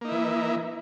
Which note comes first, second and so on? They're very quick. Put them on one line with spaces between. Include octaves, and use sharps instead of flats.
A#3 D#4 E4 E3